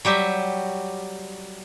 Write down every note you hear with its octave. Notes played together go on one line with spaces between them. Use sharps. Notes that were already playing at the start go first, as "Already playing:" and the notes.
F#3 G3 G4 E5